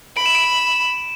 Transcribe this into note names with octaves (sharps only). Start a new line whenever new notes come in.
B5 D7
E7
D7